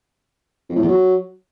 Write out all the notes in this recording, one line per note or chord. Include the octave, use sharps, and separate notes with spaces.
F2
A2
E2
F#3